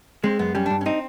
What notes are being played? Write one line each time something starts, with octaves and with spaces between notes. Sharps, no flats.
G#3 C4
F#2 B3
G3 C#4
D4
G2
C#4
C4 D#4